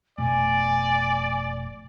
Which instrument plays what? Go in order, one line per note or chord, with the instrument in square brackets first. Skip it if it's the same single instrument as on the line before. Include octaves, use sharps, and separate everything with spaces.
[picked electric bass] F1 B2 A3 [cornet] D5 [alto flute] G#5